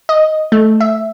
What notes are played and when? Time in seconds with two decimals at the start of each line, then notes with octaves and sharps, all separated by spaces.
0.09 D#5
0.52 A3
0.80 E5